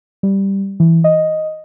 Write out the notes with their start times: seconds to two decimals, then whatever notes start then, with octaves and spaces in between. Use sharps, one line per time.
0.23 G3
0.80 E3
1.04 D#5